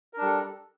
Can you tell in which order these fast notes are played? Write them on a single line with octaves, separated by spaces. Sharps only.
A#4 D4 G3 A4